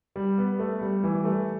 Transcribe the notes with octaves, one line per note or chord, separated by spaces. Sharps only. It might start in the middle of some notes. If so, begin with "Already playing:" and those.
G3
B3
A3
G3
E3
G3
A3